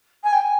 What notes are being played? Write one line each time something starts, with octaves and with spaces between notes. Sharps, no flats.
G#5
G5
G#5